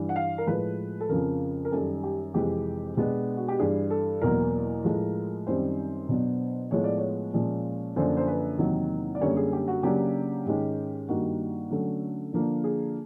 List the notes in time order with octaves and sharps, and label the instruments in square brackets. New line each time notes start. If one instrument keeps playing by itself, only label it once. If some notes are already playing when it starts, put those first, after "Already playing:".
Already playing: [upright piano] G2 E3 G3
F#5
F5
A#4
A2 F3 G#3 B4
A4
F2 C#3 F3 A#4
A#4
F#2 D#3 G3 A4
G4
F2 C3 E3 G#3 C4 G4
B2 G#3 B3 D4
F#4
G4
G2 E3 G3 G#4
A4
E2 B2 F#3 A#3 A#4
A2 F3 G#3
F#2 D#3 G3 C4 C5
B2 F#3 B3 D4
A2 F3 G#3 B3 C#5
D5
C#5
A#2 F3 G#3 C#4
F#2 D3 F3 A#3 D4 C5
C5
B4
E2 C3 D#3 F#3 A#3
D5
F#2 D3 G3 A#3 C#4 C#5
G#4
G4
F#4
C#3 F#3 A#3 D4 G4
G#2 D#3 G#3 C#4
G2 D#3 G3 A#3 F#4
D3 F#3 A3 C#4
D3 F3 A#3 D4
G#4